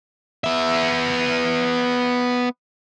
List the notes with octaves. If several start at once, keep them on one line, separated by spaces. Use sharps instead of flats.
B3 E5